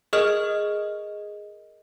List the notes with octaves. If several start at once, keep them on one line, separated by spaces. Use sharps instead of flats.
G#4 A#4 D#5 F6